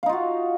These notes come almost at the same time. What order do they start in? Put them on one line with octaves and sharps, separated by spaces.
F5 D#4 F4 F#4